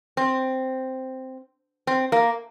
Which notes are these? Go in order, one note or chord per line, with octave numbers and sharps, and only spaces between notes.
C4
C4
A#3